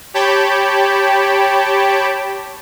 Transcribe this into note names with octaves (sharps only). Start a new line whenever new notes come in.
G4 C#5 G5 A5 B5